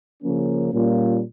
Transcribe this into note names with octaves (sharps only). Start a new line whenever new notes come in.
C#3 F3 A#3 C#4
A#2 G3 A#3 C#4 F4